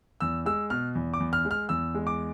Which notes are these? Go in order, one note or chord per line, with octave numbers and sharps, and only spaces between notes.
E2 E6
G#3 E6
B2 F6
E2
D6
E2
F6
G#3
F6
E2 E6
G#3
D6